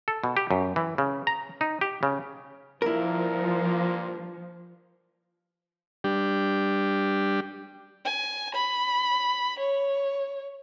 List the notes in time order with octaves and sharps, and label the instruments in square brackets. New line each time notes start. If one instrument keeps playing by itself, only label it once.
[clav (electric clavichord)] A4
B2
G4
F#2
E3
C#3
A#5
D#4
G4
C#3
[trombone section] G2 A#2 A#3 [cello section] F3 [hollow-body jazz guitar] E4 A#4
[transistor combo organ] G3 D4 G4
[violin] G#5
B5
C#5